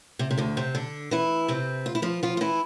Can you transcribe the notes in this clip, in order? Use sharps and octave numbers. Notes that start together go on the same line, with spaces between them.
C3
C3
D2 D3
C3 C4
D3 D4
E3 E4
C3 C4
F4
E4
F3 F4
F3 F4
F4
E3 E4